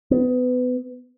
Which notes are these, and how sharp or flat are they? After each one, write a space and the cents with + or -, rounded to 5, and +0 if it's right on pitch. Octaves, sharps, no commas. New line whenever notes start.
B3 +25